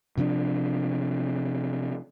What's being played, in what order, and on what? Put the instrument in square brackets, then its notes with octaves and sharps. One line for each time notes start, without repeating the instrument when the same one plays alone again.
[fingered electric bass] C3 F3 C#4 D4